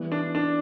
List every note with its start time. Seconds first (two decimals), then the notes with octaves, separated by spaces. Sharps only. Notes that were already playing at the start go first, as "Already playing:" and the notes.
Already playing: E3 G3 B3 E4
0.12 D4
0.35 D4